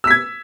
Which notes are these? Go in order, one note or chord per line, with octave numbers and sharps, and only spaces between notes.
E6 G#6 B6